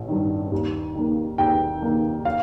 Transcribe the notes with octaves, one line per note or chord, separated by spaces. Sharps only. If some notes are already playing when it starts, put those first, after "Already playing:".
Already playing: A1
G2 D#3
D#2
D#3 A#3
D#2 G5
D#3 A#3
F5